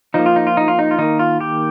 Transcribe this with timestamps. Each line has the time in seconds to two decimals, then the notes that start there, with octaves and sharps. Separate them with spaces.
0.14 F3 A#3 D#4
0.26 F4
0.36 D#4
0.47 F4
0.57 D#4
0.68 F4
0.79 D#4
0.91 F4
0.98 D#3 A#3 D#4
1.19 F4
1.41 G4